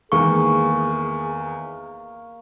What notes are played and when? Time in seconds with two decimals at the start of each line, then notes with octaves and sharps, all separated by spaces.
0.12 E2 D#3 G#3 A#3 G#4 C#6